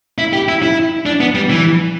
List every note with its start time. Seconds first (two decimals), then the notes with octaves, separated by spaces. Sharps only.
0.18 E4
0.33 G4
0.49 E4
0.63 E4
1.06 D4
1.20 B3
1.35 G3
1.50 E3